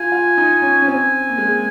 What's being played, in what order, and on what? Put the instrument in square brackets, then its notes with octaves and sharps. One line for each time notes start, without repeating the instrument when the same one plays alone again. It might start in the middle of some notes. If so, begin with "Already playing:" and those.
Already playing: [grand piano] F4 [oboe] G#5
[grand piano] F4
D#4
C#4
C#4
[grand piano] C4 [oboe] G#5
[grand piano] A#3
G#3